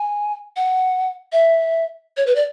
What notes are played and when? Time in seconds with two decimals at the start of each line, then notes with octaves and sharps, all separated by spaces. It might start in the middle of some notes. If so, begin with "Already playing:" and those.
Already playing: G#5
0.56 F#5
1.32 E5
2.17 C#5
2.27 B4
2.36 D5